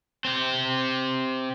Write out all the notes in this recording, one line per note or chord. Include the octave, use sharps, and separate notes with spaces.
C4 G4